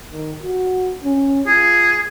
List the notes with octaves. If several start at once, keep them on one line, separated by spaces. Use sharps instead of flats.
D#3
F#4
C#4
F4 G#4